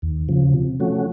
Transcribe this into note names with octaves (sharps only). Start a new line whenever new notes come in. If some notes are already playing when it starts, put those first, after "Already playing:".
D#2
C#3 F3
C3
F3 A3 C#4 F#4